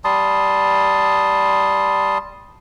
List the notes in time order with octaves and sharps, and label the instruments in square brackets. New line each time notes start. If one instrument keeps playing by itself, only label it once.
[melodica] G3 A5 C6 D#6